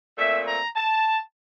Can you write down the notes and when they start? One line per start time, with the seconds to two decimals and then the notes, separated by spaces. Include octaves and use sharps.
0.17 A#2 A3 C4 E5
0.47 A#5
0.76 A5